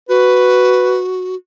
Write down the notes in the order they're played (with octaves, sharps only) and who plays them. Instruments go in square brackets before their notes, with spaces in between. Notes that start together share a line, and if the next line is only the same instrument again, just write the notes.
[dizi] F#4 [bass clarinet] B4